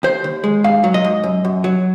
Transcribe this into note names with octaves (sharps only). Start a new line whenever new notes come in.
D#2 C5
D#2
G#3
G#2 F5
F#3
D#5
G#2
F#2
F#2
F#3